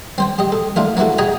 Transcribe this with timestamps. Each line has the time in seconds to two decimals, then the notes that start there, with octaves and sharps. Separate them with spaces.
0.18 C4 C5 G5
0.39 G4 D#5
0.52 A4
0.76 D3 A3 F4 A#4
0.97 A#3 B3 E4 F#4 A4
1.18 F#4 G#4 D#5 G5 G#5 A#5